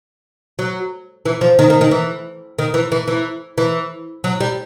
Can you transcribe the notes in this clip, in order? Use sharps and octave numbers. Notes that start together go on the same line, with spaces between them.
F#3
E3
F3
D#3
D#3
D#3
E3
D#3
E3
E3
E3
E3
F#3
G3